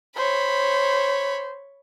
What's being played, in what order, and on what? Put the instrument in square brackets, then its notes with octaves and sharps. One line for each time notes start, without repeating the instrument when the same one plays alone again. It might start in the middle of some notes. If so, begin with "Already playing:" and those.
[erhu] C5 [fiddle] C#5 B5